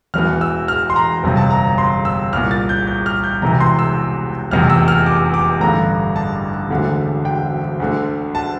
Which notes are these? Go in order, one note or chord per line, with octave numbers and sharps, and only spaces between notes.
E1 E2 E3 F6
E6
F6
C6
A#5
G1 F2 C3
A5
A#5
A#5
C6
E6
C2 A#2 F6
A6
G6
G6
F6
G6
E1 E2 C3 E3 A#5
C6
E6
F1 E2 C3 F6
E6
F6
D6
D6
A1 G2 D3 A#5
A5
E1 D2 D3
G5
D2 D3
A5